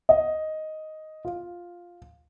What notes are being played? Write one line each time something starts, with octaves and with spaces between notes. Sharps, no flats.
D#5
F4